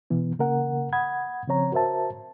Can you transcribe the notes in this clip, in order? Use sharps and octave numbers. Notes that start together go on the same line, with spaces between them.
B2 E3 B3
C#3 A#3 A#4 F#5
F#5 B5 D#6 G#6
C#3 F3 C4 C#5 A#5
F#4 A#4 C5 E5 A5